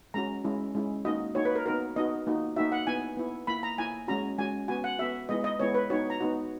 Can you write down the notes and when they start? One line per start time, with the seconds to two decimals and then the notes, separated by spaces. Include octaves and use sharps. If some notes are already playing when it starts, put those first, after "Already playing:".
0.14 G#3 C#4 F#4 A#5
0.44 G#3 C#4 E4
0.75 G#3 C#4 E4
1.05 A#3 D#4 F#4 D#5
1.35 A#3 D#4 F#4 C#5
1.45 B4
1.55 A#4
1.66 B3 D#4 F#4 A#4
1.96 B3 D#4 F#4 D#5
2.27 A#3 D#4 F#4
2.56 A#3 D#4 F#4 E5
2.72 F#5
2.87 B3 E4 G#5
3.17 B3 E4
3.47 A#3 E4 B5
3.63 A#5
3.78 A#3 E4 G#5
4.08 G#3 C#4 F#4 A#5
4.38 G#3 C#4 F#4 G#5
4.68 B3 F#4 G#5
4.84 F#5
4.99 B3 F#4 E5
5.29 G#3 B3 E4 D#5
5.44 D#5
5.60 G#3 B3 E4 C#5
5.74 B4
5.90 B3 D#4 F#4 C#5
6.10 A#5
6.20 B3 D#4 F#4